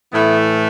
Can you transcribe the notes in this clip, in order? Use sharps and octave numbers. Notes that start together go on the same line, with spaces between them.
A2 E3 A3 B3 E4